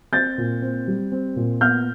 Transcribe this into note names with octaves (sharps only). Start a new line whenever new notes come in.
C4 G6 A6
A#2
C4
G3
C4
A#2
B3 F6 G6